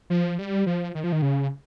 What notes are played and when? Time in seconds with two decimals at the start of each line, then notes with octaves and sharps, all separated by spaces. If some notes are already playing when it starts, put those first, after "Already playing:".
0.10 F3
0.39 G3
0.66 F3
0.95 D#3
1.04 F3
1.12 D#3
1.22 C#3